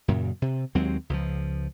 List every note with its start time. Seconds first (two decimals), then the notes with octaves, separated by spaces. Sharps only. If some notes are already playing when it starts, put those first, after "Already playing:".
0.08 F#2 A#2 C#3
0.42 C3
0.75 D#2 F#3 G#3 C4
1.10 C#2 F3